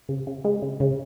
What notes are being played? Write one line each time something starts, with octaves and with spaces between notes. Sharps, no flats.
C#3
C#3
G#3
C#3
C#3